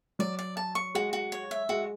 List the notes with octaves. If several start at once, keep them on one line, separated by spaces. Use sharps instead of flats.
F#3 D5
D5
A5
C#6
G#3 F#4
F#4
C#5
E5
G#3 F#4